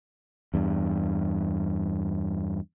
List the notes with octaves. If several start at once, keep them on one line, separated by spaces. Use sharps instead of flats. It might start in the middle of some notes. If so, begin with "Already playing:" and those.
E2 G2